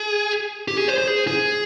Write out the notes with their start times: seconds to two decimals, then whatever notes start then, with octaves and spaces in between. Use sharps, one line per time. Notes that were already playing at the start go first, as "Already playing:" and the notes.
Already playing: G#4
0.68 G4
0.78 G#4
0.88 C5
0.98 C5
1.07 G#4
1.28 G#4